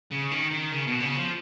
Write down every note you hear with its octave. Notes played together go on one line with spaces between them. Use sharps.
C#3
D#3
D#3
C#3
B2
C#3
F3